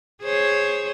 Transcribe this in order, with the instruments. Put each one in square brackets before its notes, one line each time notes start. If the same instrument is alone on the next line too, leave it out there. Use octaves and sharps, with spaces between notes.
[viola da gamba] G#4 C5 C#5